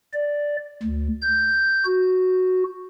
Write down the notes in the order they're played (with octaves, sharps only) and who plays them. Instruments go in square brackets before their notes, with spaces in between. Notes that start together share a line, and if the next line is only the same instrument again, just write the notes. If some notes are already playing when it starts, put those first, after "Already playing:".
[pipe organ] D5
D2
G6
F#4